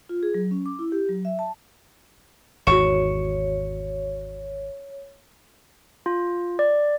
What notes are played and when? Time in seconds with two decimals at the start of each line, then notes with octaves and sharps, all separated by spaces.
0.09 F4
0.23 G#4
0.34 F#3
0.51 C#4
0.66 D6
0.79 E4
0.92 G4
1.09 F#3
1.25 E5
1.39 A5
2.67 G#1 E2 F#4 C#5 C#6 E7
6.06 F4
6.59 D5